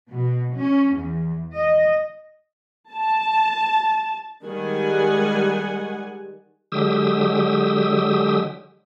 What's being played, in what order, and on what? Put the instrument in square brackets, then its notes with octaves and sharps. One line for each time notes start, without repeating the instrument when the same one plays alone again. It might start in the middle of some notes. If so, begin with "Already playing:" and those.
[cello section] B2
C#4
E2
D#5
[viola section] A5
D#3 G3 G#3 G4 F#5 G#5
[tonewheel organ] D3 F#3 G#3 G4 D#6 E6